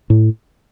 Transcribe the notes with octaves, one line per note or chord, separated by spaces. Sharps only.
A2